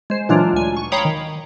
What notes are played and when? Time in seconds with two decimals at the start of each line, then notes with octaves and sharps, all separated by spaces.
0.10 G#3 C5
0.29 A#2 E3 F#3 G#3 D4 F4
0.53 D2 G#5
0.77 C#6
0.92 C#5 F5 G5 A#5 B5 D#6
1.05 D#3